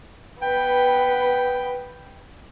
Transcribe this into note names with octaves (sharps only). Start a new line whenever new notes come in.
B3 B4 G5